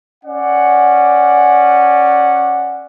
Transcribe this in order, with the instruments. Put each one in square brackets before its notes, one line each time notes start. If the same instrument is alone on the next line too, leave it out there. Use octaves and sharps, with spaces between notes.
[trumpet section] C#4 D5 F#5